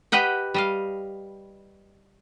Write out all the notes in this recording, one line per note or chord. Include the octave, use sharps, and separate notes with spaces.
G4 B4 D#5 F#5 G5
G3 D#5 F5